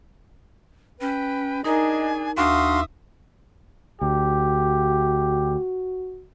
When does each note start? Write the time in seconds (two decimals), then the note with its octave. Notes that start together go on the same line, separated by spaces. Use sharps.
1.01 C#4 B4 G5
1.64 D4 D#4 G#4 A#4 D#5 G#5 A#5
2.37 D#2 D4 F#4 E5 F5 C6 D#6
4.02 D2 F#4 G4